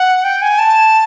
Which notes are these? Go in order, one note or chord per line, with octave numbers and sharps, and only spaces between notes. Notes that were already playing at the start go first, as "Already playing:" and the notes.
Already playing: F#5
G5
G#5
A5